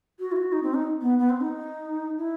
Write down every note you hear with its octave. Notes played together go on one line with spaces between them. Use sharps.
F#4
E4
F#4
D#4
C4
D#4
B3
B3
C4
D#4
E4